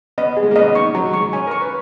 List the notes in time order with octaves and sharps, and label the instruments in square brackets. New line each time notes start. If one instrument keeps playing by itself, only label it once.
[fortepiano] B3 [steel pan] D#5
[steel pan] G#4
[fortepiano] G#3
A#3
[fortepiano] B3 [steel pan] D#5
[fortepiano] C#4
[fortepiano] D#4 [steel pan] C#6
[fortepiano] F#3 [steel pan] A#5
[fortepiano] G#3 [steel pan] C#6
[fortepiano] C#4 [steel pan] G#5
[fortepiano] A#4
[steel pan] C#6
[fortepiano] B4